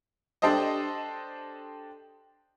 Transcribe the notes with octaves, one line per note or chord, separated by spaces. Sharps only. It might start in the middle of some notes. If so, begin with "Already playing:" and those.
D4 G4 A4 C5 D#5